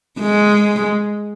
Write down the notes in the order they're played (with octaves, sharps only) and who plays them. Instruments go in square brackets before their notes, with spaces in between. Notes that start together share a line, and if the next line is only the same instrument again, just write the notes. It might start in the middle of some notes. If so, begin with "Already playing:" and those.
[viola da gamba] G#3